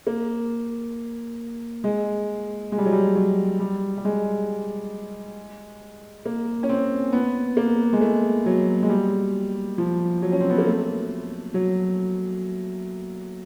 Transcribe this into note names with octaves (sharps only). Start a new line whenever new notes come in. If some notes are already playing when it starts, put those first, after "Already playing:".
A#3
G#3
G#3
G3
F#3
G3
F#3
G3
G3
G#3
A#3
C#4
C4
B3
A#3
G#3
A3
F#3
G#3
G3
F3
F#3
C#4
C4
B3
A#3
A3
F#3